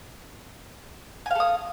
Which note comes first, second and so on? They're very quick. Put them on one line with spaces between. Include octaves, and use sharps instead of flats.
G#5 F5 A4 D#6